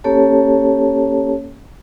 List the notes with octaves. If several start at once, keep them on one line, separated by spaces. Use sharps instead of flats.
A#3 C#4 G4 A4 C#5 A5